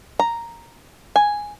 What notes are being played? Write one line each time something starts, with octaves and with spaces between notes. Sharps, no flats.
A#5
G#5